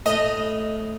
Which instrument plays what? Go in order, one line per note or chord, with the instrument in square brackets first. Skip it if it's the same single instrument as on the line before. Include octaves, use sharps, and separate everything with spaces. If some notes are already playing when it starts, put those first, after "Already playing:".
[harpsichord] A2 [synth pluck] D#5